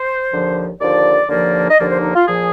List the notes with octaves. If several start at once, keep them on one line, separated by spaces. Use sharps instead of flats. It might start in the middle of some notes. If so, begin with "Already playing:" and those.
Already playing: C5
D#2 D3 F3
D#2 D3 F3 D5
D#2 D3 F3 A#3 D5
D#5
D#2 D3 F3 A#3 D5
C5
D#4
F4
A#2 F3 G#4